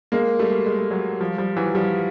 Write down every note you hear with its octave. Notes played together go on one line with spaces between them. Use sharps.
G#3 A#3
G3 A3
G#3
A3
F#3 G#3
F3 G3
F3 G3
E3 F#3
F3 G3